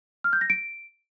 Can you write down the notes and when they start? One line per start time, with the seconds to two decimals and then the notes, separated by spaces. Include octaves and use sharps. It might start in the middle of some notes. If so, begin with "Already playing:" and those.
0.24 F6
0.33 G6
0.41 A#6
0.50 D7